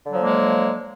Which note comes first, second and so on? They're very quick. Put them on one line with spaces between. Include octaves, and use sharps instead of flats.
D3 F#3 F3 A#3 G#3